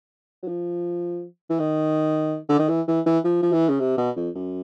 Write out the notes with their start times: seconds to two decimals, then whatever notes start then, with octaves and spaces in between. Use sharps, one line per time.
0.43 F#3
0.48 F3
1.50 E3
1.59 D#3
2.49 D3
2.59 D#3
2.69 E3
2.88 E3
3.06 E3
3.24 F3
3.42 F3
3.52 E3
3.69 C#3
3.80 C3
3.98 B2
4.16 F2
4.35 F#2